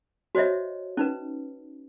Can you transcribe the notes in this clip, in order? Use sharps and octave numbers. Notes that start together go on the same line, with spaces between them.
F#4 C5 C#5 D#5 E5
C#4 D#4 B4